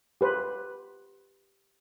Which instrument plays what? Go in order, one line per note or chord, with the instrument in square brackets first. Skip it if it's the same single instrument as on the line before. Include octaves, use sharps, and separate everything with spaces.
[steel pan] G4 B4 C5